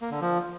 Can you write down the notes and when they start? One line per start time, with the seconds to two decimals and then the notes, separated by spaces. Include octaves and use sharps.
0.01 A#3
0.11 D3
0.21 F3